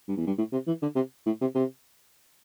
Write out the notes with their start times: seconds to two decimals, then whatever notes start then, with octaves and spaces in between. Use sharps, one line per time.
0.08 G2
0.17 E2
0.27 G2
0.38 A2
0.52 C3
0.67 E3
0.82 D3
0.96 C3
1.26 A2
1.41 C3
1.55 C3